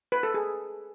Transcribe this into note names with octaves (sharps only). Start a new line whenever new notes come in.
B4
A4
G#4